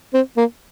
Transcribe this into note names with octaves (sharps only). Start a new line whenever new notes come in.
C4
A#3